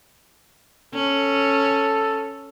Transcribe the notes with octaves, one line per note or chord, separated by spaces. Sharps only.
C#4 A4